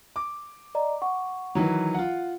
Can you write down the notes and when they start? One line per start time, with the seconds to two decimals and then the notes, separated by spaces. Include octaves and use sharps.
0.16 D6
0.75 D5 D#5 A#5
1.02 F#5 C#6
1.55 D#3 E3 F#3
1.94 F4 F#5